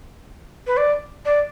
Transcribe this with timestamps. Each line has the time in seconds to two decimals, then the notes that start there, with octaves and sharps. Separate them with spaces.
0.67 B4
0.77 D5
1.25 D5